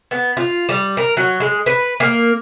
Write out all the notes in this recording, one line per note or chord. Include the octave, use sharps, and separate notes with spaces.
B3
F4
G3
A#4
F#3
G#3
B4
A#3